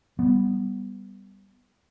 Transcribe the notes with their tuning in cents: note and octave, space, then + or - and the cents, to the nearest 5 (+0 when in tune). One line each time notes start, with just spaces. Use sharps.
G3 +0 B3 +0